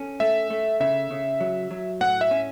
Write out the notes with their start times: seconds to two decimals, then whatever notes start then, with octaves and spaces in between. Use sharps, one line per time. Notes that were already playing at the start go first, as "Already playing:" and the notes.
Already playing: C#4 A4
0.20 A3 E5
0.50 A3
0.80 C#3 E5
1.11 C#3
1.40 F#3
1.71 F#3
2.01 A2 F#5
2.21 E5
2.31 C#4